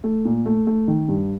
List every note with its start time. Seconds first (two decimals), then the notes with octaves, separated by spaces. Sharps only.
0.04 A3
0.25 A#2
0.46 A3
0.67 A3
0.88 D#3
1.08 G2